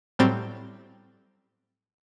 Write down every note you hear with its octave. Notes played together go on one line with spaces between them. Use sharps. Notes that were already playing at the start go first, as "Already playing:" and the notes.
A2 F#3 G3 C4 A6